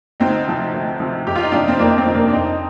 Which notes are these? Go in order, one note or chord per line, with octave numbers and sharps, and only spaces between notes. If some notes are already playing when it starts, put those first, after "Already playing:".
D2 C4 D#4
C3 F3
D2
C3 F3
F2 G4
F4
D#4
C3 F3 D4 F4
C4
F2 A#3 D4
D4
C4
C3 F3
A#3 D4
D4
F2 C4 D#4